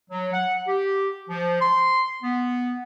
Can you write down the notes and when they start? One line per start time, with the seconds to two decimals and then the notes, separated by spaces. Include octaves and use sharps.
0.10 F#3
0.33 F#5
0.67 G4
1.30 F3
1.61 C6
2.23 B3